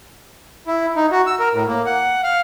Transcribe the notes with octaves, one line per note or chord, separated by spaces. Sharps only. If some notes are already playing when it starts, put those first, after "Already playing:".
E4
D#4
F#4
E6
A#4
A2
A#3
F#5
F5